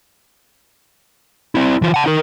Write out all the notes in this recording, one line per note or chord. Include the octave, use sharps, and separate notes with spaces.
C4 E4
E3 F4
F#5 A5
D#4 A#4